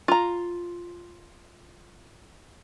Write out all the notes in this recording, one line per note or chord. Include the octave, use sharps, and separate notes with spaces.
F4 A#5